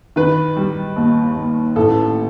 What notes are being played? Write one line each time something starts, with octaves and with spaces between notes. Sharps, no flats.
D#3 B4
G3
D#2
D#2
A1 A4